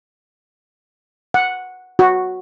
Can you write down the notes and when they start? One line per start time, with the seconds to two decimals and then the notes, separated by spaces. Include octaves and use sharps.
1.34 F#5
1.99 F#4